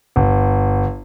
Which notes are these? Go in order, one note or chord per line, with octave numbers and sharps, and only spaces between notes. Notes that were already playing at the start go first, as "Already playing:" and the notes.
G1